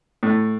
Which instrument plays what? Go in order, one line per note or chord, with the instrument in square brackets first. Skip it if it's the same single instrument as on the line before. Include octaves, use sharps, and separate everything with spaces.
[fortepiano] A2